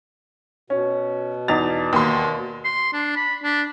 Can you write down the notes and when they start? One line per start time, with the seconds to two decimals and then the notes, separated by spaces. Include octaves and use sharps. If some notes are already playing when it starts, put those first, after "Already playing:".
0.70 B2 C#4
1.48 E2 D#4 A6 F7
1.93 D#2 C6
2.64 C6
2.93 D4
3.16 B5
3.43 D4